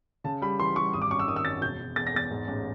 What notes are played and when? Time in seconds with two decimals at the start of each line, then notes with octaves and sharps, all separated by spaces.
0.24 C#3 A5
0.42 G3 B5
0.59 E3 C6
0.76 G3 C#6
0.93 G#1 D#6
1.02 D6
1.10 F#2 C#6
1.19 E6
1.27 D#3 D#6
1.36 E6
1.45 F#2 A6
1.62 E1 G6
1.79 E1
1.96 E2 A6
2.07 A#6
2.14 E2 A6
2.31 G#2
2.48 A1